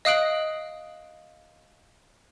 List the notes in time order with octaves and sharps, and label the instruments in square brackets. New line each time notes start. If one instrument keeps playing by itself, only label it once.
[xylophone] D#5 F5 D#6 F#6 D7 F#7